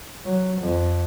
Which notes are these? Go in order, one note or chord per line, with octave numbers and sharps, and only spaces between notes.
F#3
F2